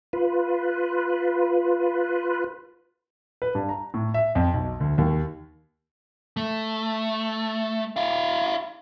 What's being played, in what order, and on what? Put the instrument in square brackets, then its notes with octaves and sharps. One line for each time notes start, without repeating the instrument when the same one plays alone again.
[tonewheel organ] F4 B4
[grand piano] B4
G2
A#5
A2
E5
F2
B1
D2
D#2
[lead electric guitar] A3
E4 F5